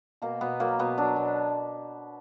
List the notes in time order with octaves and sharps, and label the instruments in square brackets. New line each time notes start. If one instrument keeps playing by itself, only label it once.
[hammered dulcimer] B2 A#3
B2 B3
F#3 A#3
B2 B3
F#3 D4
B2